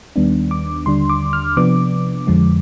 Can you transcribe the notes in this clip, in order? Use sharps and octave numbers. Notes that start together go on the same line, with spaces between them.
D#2 D#3 G3 B3 D4
D6
D#2 D3 G3 D4 C6
D6
F6
C3 F3 B3 D4 D6
F2 D3 F3 G#3